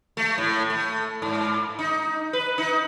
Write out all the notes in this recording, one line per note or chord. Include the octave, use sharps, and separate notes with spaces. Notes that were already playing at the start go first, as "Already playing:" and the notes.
A3
A2
A3
G#2
D#4
B4
D#4